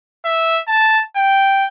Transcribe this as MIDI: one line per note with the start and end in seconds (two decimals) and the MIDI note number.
0.25 0.61 76
0.69 1.01 81
1.16 1.66 79